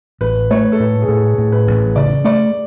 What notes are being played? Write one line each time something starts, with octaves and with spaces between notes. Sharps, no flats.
A1 B4
A3 C#5
A4
A2 B4
G#4
A2 A4
A2
B4
A1
C#3 D5
A3 D5